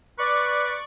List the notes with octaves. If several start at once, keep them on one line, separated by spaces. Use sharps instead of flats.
B4 D5 C#6 D6